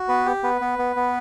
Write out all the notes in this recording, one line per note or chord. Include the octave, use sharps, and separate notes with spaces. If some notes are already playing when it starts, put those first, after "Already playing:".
Already playing: F#4
B3 B4
G4
B3 B4
B3
B3
B3